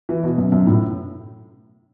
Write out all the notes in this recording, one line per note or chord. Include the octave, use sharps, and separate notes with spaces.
E3
B2
F#2
F#2
A2